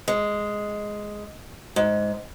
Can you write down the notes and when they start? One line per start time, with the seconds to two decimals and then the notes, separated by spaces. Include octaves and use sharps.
0.08 G#3
1.76 G#2